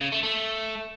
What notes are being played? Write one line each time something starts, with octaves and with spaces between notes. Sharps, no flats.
C#3
A3
A3